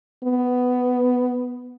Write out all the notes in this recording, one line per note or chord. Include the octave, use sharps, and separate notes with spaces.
B3